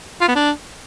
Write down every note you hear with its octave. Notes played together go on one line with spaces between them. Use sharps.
F4
B3
D4